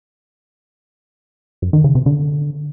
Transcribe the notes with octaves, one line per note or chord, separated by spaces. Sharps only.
F#2
D#3
C#3
C3
D3